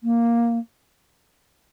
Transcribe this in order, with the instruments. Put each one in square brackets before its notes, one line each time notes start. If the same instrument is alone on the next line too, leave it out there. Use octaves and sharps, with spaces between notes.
[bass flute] A#3